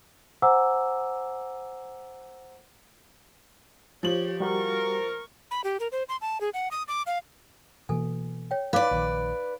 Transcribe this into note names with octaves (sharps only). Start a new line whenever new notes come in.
C5 F#5 G#5 A#5 D6 E6
F3 G4 C#5 F#7
G3 F#4 G4 A#4 C#6
B5
G4
A#4
C5
C6
A5
G#4
F#5
D#6
D6
F5
B2 E3 A#3 A4 G#5
C#5 G5
D#4 B4 D5 F5 D6
A#1 D#3